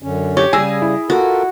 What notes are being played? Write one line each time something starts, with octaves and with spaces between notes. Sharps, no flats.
F#2 D3 C#4
G4 C#5
C#3 G3 G#4 G#5 E6 A#6
E4
F4 F#4 A4 A#4